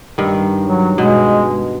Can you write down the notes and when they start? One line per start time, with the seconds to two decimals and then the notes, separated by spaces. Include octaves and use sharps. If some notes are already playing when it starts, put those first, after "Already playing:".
0.18 G2 D#3
0.66 F#3
0.98 B2 G#3